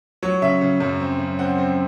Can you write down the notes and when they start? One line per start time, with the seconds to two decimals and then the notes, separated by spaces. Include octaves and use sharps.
0.23 F#3 C#5
0.42 C#3 E5
0.61 C#3
0.80 F#2
1.00 C4
1.19 C#3
1.39 C4 F#5
1.58 C4